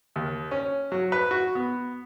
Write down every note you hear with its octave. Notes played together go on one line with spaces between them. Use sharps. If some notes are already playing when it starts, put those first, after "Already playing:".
D#2
C#4
F#3
B4
F#4
B3